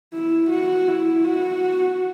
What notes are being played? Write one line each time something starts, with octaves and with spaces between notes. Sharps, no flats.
E4
F#4
E4
F#4